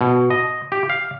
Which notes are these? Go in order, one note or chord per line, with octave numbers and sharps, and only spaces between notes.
B2
D#5
G4
F5